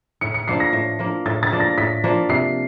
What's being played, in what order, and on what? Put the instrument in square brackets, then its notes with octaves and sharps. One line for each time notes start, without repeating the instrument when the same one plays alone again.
[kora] A2 [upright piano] C#7
[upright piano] C#7
[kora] F3 A#3 D4 [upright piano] C7
[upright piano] A#6
[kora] A2
F3 A#3 D4
[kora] A2 [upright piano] A6
[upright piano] A6
[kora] F3 A#3 D4
[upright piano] A#6
[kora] A2 [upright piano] B6
[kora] F3 A#3 D4
[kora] C3 [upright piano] C7